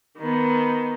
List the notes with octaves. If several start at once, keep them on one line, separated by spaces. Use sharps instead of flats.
D#3 B3